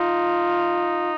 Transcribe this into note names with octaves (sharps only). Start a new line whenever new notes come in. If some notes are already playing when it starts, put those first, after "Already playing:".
Already playing: D#4 F4